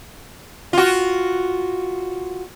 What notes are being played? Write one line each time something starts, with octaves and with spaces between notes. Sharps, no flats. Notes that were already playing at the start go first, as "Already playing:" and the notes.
F4 F#4